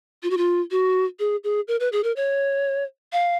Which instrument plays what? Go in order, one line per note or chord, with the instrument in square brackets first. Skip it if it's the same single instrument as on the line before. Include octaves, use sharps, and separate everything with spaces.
[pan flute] F4
F#4
F4
F#4
G#4
G#4
A#4
B4
G#4
A#4
C#5
F5